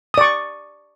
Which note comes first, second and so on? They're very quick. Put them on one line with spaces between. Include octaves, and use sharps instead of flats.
D#6 D5 C#6